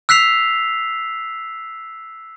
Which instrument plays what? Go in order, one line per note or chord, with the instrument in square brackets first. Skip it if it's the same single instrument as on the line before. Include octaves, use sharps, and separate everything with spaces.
[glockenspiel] E6 F#6 B6 C7 F7